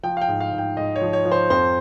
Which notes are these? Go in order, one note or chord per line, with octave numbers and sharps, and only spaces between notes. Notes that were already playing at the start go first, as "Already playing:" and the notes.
F3 G5
F5
G5
G#2
F5
G#2
G5
G#2 D#5
C#5
F3
C#5
F3
C5
F2 C5